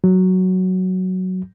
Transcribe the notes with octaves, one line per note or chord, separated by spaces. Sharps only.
F#3